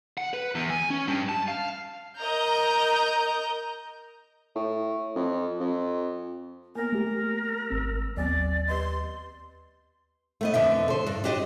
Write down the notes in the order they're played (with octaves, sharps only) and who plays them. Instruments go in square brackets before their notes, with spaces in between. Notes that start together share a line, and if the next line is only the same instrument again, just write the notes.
[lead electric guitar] F#5
B4
E2
G#5
C#4
G2
A5
F5
[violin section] A#4 D#5 A#5 G6
[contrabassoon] A2
F2
F2
[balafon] A#3 B3 [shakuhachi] A#4
[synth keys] A3 G4
G#1 C4 E6
[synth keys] D#2 [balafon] F#3 B3 C4 [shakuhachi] D5
[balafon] G4 B4 D#5 [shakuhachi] C6
[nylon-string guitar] A3 B3 D#5
F2 B2 D3 E5
A4 C5
G2
D4 F#4 G4 D5 D#5